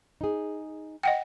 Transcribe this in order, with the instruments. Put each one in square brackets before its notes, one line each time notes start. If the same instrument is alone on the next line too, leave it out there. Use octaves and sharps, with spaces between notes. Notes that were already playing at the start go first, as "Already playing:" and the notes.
[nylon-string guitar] D#4 G#4
[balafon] D#5 F#5 G5